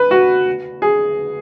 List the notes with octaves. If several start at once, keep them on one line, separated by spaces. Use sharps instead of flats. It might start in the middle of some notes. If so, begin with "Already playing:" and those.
Already playing: B4
F#4
G#4